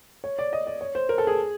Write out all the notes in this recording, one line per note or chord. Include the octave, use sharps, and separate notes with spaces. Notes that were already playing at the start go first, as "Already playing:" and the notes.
C#5
D5
D#5
D5
C#5
C5
A#4
A4
G#4